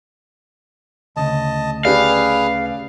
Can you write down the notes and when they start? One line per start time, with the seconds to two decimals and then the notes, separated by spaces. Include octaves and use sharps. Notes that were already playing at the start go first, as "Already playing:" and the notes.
1.16 D2 C#3 D#5 A5
1.85 C#4 G4 G#4 B4 D5 F5